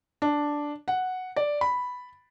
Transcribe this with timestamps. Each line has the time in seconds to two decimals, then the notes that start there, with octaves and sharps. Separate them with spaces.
0.22 D4
0.88 F#5
1.36 D5
1.61 B5